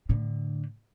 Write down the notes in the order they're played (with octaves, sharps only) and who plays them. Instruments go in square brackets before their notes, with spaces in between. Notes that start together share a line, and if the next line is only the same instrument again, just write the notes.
[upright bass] A2 D3